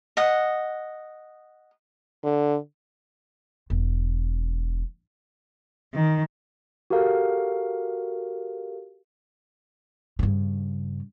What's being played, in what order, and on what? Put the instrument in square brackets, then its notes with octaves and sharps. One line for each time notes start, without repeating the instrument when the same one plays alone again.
[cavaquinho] D#5 F#5
[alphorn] D3
[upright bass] E1
[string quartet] D#3
[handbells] F#4 G4 A4 A#4 F5
[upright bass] G2 C#3